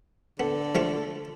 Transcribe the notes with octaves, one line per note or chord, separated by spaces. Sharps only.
D3 B3 A4
F3 A3 F4